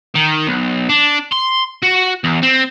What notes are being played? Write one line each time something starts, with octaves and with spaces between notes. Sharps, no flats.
D#3
B1
D4
C6
F#4
E2
C4